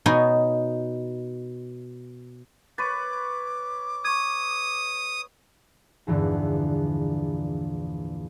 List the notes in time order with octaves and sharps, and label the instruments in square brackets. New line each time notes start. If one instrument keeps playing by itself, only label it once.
[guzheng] B2 B3 D#4 C#5 G#5
[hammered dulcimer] B4 C#5 [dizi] D6 [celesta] A6 D#7
[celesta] C#6 G#6 [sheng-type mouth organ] D#6
[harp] A#1 E2 G2 D3